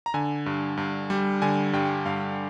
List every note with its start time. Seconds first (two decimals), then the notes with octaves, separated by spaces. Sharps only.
0.06 A#5
0.14 D3 G#5
0.46 G2
0.77 G2
1.10 G3
1.42 D3 G#5
1.73 G2 G5
2.06 G2 F5